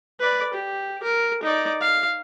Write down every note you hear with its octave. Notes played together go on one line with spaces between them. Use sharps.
B4 D5
G4
A#4
D#4 D5
F5